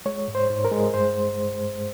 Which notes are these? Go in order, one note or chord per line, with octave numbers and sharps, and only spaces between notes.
G#3 C#5
G#2
C5
G#2
A#4
G#3
G2 C5